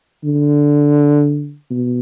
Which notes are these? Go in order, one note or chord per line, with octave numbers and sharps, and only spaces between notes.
D3
B2